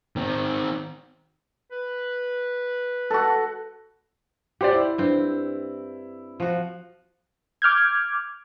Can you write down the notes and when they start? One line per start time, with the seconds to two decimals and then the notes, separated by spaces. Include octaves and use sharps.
0.16 D#3 C4
1.71 B4
3.10 F#4 A4
4.61 G4 C5 D5 F#5
4.73 E4
4.98 G2 C4
6.40 F3 F#4
7.62 D6 F6 G6 G#6